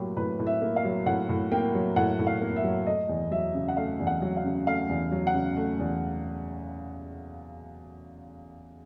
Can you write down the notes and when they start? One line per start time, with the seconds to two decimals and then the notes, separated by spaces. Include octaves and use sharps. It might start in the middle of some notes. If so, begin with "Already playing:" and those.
Already playing: A2 F#3 A#3 G4
0.16 A2 B4
0.39 A2
0.47 E5
0.62 A#3
0.76 F5
0.85 F#3
1.06 A2 F#5
1.29 A2
1.52 A#3 G5
1.74 F#3
1.96 A2 F#5
2.19 A2
2.27 F5
2.41 A#3
2.56 E5
2.64 F#3
2.87 A3 D#5
3.09 E2
3.31 F#3 E5
3.54 C#3
3.68 F#5
3.77 A3 F5
3.99 E2
4.07 F#5
4.22 F#3
4.37 F5
4.45 C#3
4.67 A3 F5
4.89 E2
5.12 F#3
5.27 F#5
5.34 C#3
5.57 A3
5.79 E2